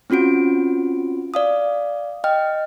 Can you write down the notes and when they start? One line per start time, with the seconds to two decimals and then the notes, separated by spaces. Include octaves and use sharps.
0.10 C4 C#4 F4 F#4 D7
1.34 D5 F5 D#6
2.24 D#5 G5 F6